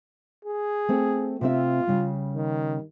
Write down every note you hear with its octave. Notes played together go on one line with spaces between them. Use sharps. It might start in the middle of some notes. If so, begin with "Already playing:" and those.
G#4
A3 C4 A4
C3 C4 F4 E5
C#3 G3
D#3